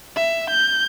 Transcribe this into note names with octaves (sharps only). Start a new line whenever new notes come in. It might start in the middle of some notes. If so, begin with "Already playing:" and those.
E5
G6